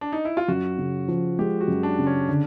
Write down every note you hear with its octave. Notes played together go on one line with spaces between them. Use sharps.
D4
D#4
E4
F4
F#2 F#4
C#3
F3
G#3 G4
F#4
F#2
D4
C#3
C#4
D3 D4